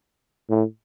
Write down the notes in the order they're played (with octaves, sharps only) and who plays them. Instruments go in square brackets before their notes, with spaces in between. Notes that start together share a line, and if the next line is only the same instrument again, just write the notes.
[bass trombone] A2